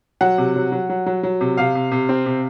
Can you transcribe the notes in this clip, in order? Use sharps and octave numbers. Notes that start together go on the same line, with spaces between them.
F#3 F#5
C3
F#3
F#3
F#3
F#3
F#3
C3
C3 F5
C3
C3
C4
C3